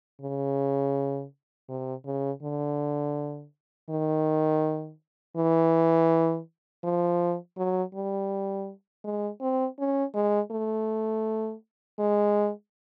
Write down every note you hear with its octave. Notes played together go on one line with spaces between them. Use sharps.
C#3
C3
C#3
D3
D#3
E3
F3
F#3
G3
G#3
C4
C#4
G#3
A3
G#3